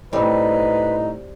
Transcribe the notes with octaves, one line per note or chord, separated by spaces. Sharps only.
A2 G3 C4 D#4 B4